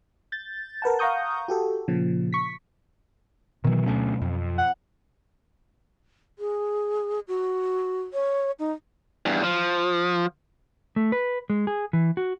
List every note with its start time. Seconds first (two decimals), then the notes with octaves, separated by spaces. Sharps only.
0.32 G6 A6
0.82 A#4 B4 F#5 A5
0.99 F5 F#5 A#5 C#6 D#6 G6
1.48 F#4 G4 A4
1.88 A#2 C#3 F3
2.33 C#6 B6
3.65 B2 D#3 E3 F#3
3.86 D2 A3 C#4
4.22 F2
4.58 F#5
6.39 G#4
7.28 F#4
8.13 C#5
8.59 D#4
9.26 E2 G2
9.44 F3
10.96 A3
11.12 B4
11.50 G#3
11.67 G#4
11.93 E3
12.17 F#4